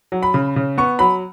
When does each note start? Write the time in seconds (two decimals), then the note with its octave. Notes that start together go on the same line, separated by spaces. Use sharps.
0.12 F#3
0.23 B5
0.34 C#3
0.56 C#3
0.78 B3 C#6
0.99 F#3 B5